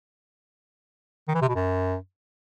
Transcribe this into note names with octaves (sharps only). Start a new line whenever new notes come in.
D#3
E3
C3
B2
F#2